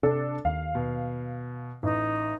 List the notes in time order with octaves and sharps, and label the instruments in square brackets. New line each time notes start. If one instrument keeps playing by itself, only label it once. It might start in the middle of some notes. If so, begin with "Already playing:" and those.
[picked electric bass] C3 [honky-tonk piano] D4 A4
[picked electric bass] D#2 [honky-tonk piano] F5
[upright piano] B2
[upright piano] A1 [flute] D#4